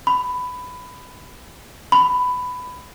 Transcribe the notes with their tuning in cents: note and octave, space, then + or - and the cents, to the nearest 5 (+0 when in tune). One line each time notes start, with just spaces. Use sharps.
B5 +15
B5 +15